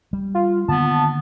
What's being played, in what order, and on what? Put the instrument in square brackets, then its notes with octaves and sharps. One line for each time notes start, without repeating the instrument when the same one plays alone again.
[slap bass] G3
[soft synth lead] F4
[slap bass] D3 D#3 A#3 [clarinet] B3 [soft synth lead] A5